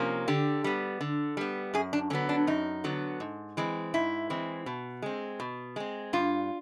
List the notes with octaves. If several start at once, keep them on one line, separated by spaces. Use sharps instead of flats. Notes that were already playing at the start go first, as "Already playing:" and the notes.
Already playing: C3 F3 A#3 C#4
D3 G4
G3 B3
D3
G3 B3
F#2 G#4
D4
D3 F#3 B3 C#4
D4
F#2 D#4
D3 F#3 B3
G#2
E3 G#3 C4
G#2 E4
E3 G#3 C4
B2
G#3 C4
B2
G#3 C4
G2 F4